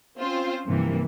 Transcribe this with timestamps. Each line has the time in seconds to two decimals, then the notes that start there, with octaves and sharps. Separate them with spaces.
0.19 C4 C#4 F4 C5
0.67 G2 C3 E3 F3 A#3